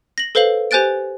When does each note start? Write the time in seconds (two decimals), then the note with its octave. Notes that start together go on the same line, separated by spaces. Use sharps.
0.18 A#6 F#7
0.35 A4 B4 C5 F5 F#7
0.71 G4 C5 G#5 F#6 A6 D7